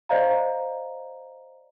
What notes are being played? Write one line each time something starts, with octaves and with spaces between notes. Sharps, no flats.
C5 D5 D#5 F5 A#5